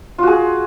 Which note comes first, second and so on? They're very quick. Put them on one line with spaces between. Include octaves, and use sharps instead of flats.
F4 F#4 G#4